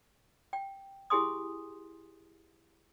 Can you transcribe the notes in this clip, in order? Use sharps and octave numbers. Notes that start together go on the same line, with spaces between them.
G5
E4 G4 G#4 G#5 C6 D#6